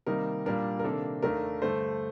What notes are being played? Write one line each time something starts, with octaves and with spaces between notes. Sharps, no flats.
C3 D#3 G3 A#3 D#4 A#4
A#2 G3 A#3 D4 A#4
A#4
C3 D#3 A#3 D4 A4
D#2 D#3 A3 D4 A#4
G2 D3 A3 C5